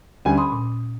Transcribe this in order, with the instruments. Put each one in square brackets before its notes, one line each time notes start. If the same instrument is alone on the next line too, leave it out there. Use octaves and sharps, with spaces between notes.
[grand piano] D2 G3 G#5 [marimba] C#4
[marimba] B5 C6 [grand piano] D#6
[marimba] A#2